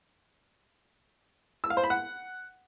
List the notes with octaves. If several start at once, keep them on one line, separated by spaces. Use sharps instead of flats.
E6
F5
C5
B5
F#5